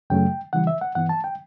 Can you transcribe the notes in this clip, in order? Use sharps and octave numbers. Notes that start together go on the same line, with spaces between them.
F#2 C#3 F#3 A3 G5
C#3 E3 G3 F#5
E5
F#5
G2 E3 B3 F#5
A5
G5